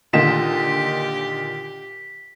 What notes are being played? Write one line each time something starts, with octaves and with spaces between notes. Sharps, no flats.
A#2 D3 D#3 F4 G4 D#5 B6 E7